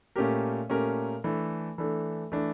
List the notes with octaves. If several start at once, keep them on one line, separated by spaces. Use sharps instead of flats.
A#2 A3 C#4 G4 A#4
A#2 A3 C#4 G4 A#4
E3 A3 D4 A4
E3 A3 D4 A4
E3 A3 D4 A4